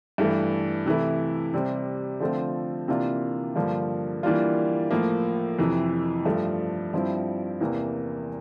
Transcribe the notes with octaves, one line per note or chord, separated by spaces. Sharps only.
G2 E3 A3
C3 E3 A3 E4
C3 G3 C4
D3 F3 A3 C4 F4
C3 E3 A#3 D4 F4
G2 D3 F3 A#3
E3 G3 A#3 D4 F4
A2 F3 A#3
F2 C3 E3
G2 F3 A3
G2 F3 C4 E4
E2 C3 E3 A#3